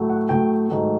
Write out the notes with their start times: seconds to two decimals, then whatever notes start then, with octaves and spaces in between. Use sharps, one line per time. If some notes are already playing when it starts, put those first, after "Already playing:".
Already playing: A2 F#3 A3
0.10 F#5
0.29 A2 F#3 A3 G5
0.69 G#2 D#3 F#3 A3